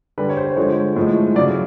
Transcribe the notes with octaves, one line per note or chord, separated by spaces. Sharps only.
D3 G3 B4
C#5
C5
D3 F3 G#3 C#5
A2 F3 G#3
C#3 F#3 D5